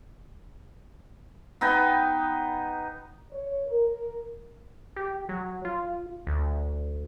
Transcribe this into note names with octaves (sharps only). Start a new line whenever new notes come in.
B3 D#4 G5 B5
C#5
A#4
G4
F#3
F4
D2